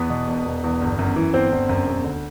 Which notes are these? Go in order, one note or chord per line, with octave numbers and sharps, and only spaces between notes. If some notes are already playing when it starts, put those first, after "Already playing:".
Already playing: E2 B3 B4
B2
E1
E1
E2
G1
F#2
E3
G1 C4 C5
G1
F#2
E1
D2